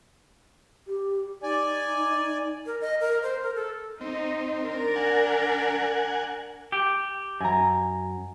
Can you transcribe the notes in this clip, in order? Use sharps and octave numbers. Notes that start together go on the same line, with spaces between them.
G4
D#4 D5 G#5
A#4
D#5
A#4
C5
A#4
A4
C4 D#4
D4 A#4
F#5 G#5
G4
F#2 G#5 A#5